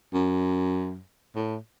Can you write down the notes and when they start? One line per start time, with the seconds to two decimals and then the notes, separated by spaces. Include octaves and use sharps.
0.14 F#2
1.35 A2